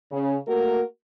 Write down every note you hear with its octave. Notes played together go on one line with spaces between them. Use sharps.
C#3
A3 A#3 F#4 A#4